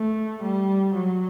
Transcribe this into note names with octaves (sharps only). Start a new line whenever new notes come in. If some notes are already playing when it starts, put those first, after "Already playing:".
Already playing: A3
G3
F#3